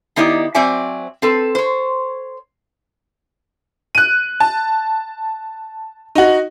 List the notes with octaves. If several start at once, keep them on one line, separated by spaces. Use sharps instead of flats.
D#3 B3 D#4 E4 G4 D5
F#3 C4 C5 D5 E5 G#5
C4 A4 B4
C5 C#5
F#6 D#7
A5
D#4 F#4